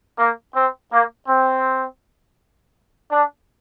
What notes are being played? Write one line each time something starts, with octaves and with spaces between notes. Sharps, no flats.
A#3
C4
A#3
C4
D4